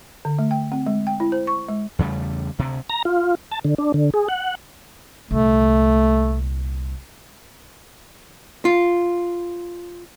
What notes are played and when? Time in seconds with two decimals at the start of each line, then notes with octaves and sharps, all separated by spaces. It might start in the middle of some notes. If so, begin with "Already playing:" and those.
0.25 D3
0.39 A3
0.51 G5
0.72 C4
0.86 G#3
1.07 G5
1.20 E4
1.32 C5
1.47 C#6
1.69 G#3
1.99 E2 C#3 G3 A3
2.59 D2 C3
2.90 A#5
3.05 F4
3.52 A5
3.65 D3
3.78 D4
3.94 D3
4.14 G#4
4.28 F#5
5.31 C2 A#2 A3
8.65 F4